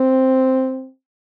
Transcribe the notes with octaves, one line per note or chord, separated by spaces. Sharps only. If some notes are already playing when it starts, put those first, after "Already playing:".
Already playing: C4